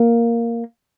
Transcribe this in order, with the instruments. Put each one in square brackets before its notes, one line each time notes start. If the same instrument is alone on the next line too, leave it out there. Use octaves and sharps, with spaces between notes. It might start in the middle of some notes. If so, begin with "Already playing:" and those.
Already playing: [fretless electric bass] A#3